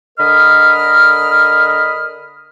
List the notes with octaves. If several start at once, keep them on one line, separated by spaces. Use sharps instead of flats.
D3 A#4 D#5 B5 D#6 F6